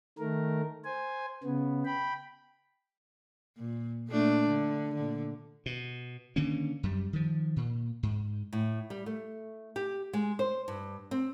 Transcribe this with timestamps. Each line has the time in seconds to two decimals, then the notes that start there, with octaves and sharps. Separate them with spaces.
0.19 D#3 A3 A#4
0.84 C5 G#5
1.44 C#3 B3
1.85 G5 B5
3.57 A#2
4.08 A#2 A3 D4
4.49 D3
4.95 A#2 D3
5.66 B2
6.36 D3 D#3 A#3 C#4
6.83 F#2 G3
7.13 D#3 F3
7.56 A#2
8.03 G#2
8.53 A2
8.90 G3
9.06 A3
9.76 G4
10.13 G#3
10.39 C5
10.68 G2
11.11 C4